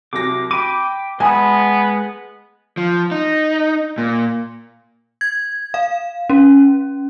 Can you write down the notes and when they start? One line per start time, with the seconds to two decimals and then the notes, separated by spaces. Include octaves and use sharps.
0.13 C2 F#3 D6 A#6
0.51 G5 B5 D6 D#7
1.20 G#3 B3 G#5 A5 B5 D#6
2.77 F3
3.11 D#4
3.98 A#2
5.21 G#6
5.74 F5
6.30 C#4